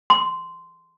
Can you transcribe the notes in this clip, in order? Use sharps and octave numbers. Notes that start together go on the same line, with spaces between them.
C6